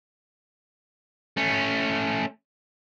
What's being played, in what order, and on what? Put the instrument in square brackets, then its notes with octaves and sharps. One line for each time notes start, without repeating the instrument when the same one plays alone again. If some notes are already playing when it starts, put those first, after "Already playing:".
[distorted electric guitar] A3 C#4